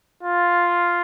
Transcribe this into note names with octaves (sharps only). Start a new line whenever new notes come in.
F4